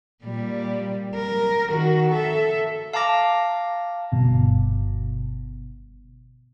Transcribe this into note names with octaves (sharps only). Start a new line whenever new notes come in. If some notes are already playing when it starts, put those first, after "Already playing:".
A#2 G3
A#4
D#3 F#4
A4 E5
F5 A5 A#5 D6 A#6
G1 B2